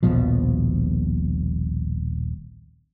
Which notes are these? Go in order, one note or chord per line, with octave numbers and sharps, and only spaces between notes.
D#1 A#1 B2 F3